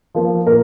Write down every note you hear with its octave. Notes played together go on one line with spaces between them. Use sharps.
F3 A#3
A#2 A#4